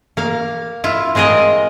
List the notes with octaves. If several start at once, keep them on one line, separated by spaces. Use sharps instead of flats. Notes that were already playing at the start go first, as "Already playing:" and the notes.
A#3 F5
E4 F4
G#3 C4 G#4 A#4 D#5